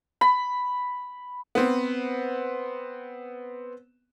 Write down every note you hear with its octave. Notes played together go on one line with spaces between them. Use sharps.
B5
B3 C4